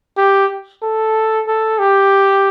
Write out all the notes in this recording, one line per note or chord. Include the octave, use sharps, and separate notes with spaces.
G4
A4
A4
G4